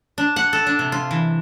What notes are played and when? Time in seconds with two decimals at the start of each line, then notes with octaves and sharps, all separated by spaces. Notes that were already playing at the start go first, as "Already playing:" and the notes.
0.18 D4
0.36 F#5
0.53 A4
0.67 D4
0.79 C3
0.92 F4
1.11 E3